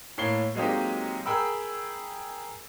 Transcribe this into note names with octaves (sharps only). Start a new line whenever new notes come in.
A2 A#3 C#5 C7 G7
F#3 G#3 A#3 C4 D#4 G4
G#4 A#4 G5 B5 E6